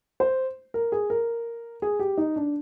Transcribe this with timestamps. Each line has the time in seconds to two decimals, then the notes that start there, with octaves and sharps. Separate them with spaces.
0.20 C5
0.74 A#4
0.92 G#4
1.10 A#4
1.82 G#4
1.99 G4
2.18 D#4
2.36 D4